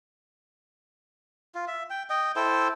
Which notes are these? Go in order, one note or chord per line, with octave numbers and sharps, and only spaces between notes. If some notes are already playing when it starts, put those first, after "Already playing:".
F4
E5
G5
D#5 G5
E4 A4 C5 G5